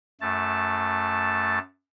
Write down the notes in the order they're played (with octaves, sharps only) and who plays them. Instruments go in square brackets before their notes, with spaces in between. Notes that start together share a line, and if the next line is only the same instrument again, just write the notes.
[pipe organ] F#2 A3 A5